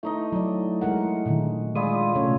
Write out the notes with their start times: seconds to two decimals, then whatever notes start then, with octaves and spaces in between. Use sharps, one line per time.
0.03 A3 D#4 E4 D#5
0.32 F#3 D5
0.81 G#3 A#4 F#5
1.26 A#2 D3 D#3
1.75 G#3 E4 F4 G#4 D5 D#6
2.15 C3 A3 C#4 A4 C#5